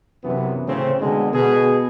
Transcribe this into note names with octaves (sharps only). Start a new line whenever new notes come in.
F#2 C3 E3 B3
A2 C#3 C4
B2 D3 G#3
B2 G#4